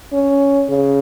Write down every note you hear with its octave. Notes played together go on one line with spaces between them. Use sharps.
C#4
C#3